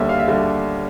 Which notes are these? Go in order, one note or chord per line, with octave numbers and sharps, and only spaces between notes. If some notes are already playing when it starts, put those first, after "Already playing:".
Already playing: D#2 D3 G3 E5
F5
E5
D3 G3